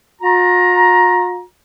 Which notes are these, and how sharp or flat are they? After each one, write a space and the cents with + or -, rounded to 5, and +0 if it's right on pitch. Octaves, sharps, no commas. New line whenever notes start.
F4 +45 A#5 +15